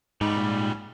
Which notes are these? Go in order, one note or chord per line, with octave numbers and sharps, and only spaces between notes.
G#2 C#3 G3 D#4
A#2